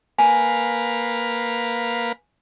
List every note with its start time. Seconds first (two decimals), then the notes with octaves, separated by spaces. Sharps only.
0.18 A#3 B4 F5 G#5